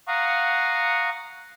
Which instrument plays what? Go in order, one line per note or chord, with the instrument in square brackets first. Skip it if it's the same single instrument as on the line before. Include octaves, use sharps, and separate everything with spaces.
[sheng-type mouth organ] F5 F#5 A#5 C#6 D#6